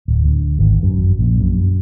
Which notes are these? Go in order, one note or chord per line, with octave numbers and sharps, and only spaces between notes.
D1
D2
G#1
F#2
A#1
F#2